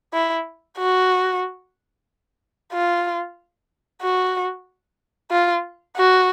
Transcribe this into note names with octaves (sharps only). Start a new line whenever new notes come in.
E4
F#4
F4
F#4
F4
F#4